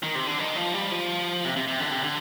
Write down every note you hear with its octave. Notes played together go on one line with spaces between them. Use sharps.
D#3
C3
D3
D#3
F3
G3
F3
C3
C3
C3
D3
C3
D3